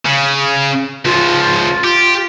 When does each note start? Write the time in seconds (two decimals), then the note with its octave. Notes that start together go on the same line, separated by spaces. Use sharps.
0.06 C#3
1.05 C#2 F3 F4
1.84 G4